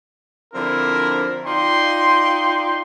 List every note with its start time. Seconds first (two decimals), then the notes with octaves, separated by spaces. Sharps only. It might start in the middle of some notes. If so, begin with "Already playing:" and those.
0.54 D3 F3 C4 D4 E4 A#4
1.46 D#4 F4 D5 G5 C6